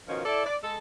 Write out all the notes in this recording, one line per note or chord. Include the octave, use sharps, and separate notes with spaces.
B2 D#3 F3 C#4 F4
E4 A4 D5
D5
G#3 A4